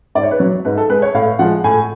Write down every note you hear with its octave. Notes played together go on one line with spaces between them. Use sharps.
G#2 D5
C#5
B4
F#3 C#5
G#2 B4
A4
G#3 B4
C#5
A2 F5
F3 G#3 F#5
A2 G#5